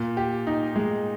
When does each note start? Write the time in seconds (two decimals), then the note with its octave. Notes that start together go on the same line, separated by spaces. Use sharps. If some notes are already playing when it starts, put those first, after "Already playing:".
Already playing: A#2
0.17 G4
0.47 D#4
0.76 G#3